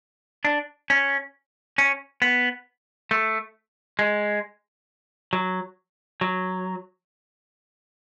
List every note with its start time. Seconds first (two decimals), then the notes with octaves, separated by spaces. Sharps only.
0.45 D4
0.90 C#4
1.78 C#4
2.22 B3
3.11 A3
3.99 G#3
5.33 F#3
6.21 F#3